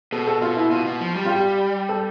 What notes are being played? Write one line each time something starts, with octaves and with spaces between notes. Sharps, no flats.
B2 A4
A4
B2 F4
E4
B2 F4
B2
F3
G3
F4
G4
A4